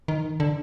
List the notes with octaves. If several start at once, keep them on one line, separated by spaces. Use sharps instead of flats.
D#3
D3